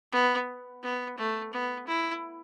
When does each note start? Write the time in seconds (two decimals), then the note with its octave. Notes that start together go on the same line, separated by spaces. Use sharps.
0.12 B3
0.83 B3
1.17 A3
1.53 B3
1.87 E4